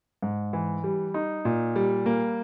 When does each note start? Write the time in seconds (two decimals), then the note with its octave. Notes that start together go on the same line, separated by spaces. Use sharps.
0.23 G#2
0.53 E3
0.84 G3
1.14 D#4
1.45 A#2
1.76 G3
2.06 A#3